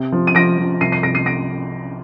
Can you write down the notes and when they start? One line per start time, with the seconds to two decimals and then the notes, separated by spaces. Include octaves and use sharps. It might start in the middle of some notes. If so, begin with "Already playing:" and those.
Already playing: C3
0.12 F3
0.27 D#7
0.35 F3 A#6 D7
0.58 F3
0.81 C2 C7 D#7
0.92 C7 D#7
1.03 C2 A#6 D7
1.15 C7 D#7
1.26 A#6 D7